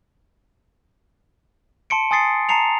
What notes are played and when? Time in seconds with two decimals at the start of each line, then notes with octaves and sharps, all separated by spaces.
1.90 A5 C6 C#7 D7
2.11 G#5 C6 D#6 A6 C7 C#7
2.49 A5 A#5 C7 C#7 F7